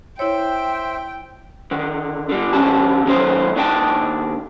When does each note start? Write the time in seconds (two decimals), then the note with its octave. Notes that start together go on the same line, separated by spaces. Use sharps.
0.19 E4 C5 C#5 E5 G5
1.71 D3 D#3
2.29 D3 G3
2.53 D3 F3 C#4 D4 G4 A5
3.05 A#2 D#3 F#3 C#4 A4 C5
3.55 D#2 D#3 D4 C#5 G5 A5